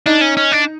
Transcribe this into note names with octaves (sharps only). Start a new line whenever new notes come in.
D4 D#4
C#4
C#4
D4